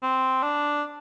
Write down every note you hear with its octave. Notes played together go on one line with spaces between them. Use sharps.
C4
D4